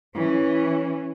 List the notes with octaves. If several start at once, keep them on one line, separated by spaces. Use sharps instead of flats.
E3 C#4